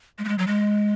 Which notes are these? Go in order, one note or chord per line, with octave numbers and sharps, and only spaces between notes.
G#3
A3
G#3
F#3
G#3